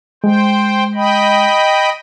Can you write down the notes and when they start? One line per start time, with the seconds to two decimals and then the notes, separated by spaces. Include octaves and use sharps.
0.24 G#3 C5 G5
0.95 D#5 G5 B5